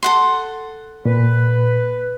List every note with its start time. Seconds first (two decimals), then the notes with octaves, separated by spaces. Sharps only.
0.03 A4 F#5 C6
1.05 A#2 B4